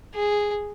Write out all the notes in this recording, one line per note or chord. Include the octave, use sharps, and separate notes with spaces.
G#4